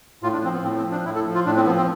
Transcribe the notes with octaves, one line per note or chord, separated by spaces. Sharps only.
A2 F4
D4
F3 C4
B3
A2 C4
C4
F3
D4
A2 E4
A4
F3
F4
A2 D4
C4
F3 B3
C4